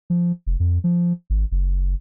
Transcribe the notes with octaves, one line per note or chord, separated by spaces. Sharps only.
F3
F1
F2
F3
G#1
F#1